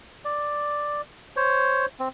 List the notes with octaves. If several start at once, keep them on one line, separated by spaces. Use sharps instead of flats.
D5
C5 C#5
C4